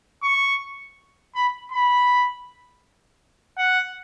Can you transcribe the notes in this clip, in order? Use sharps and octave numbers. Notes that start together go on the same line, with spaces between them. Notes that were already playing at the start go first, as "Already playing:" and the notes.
C#6
B5
B5
F#5